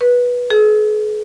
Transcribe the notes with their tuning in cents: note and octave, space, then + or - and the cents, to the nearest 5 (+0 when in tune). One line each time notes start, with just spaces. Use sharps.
B4 -15
G#4 +40